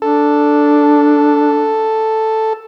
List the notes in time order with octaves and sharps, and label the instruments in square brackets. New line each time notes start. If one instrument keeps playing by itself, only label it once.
[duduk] D4 [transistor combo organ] A4